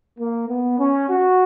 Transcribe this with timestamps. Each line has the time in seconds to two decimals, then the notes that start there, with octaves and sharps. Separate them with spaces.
0.18 A#3
0.48 B3
0.79 C#4
1.09 F#4